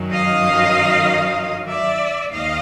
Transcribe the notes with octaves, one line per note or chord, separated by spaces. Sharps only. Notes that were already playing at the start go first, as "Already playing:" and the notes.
Already playing: F#2 D#3 F#3
D#5 F5
D5 E5
D#2 D#3 D#5 F5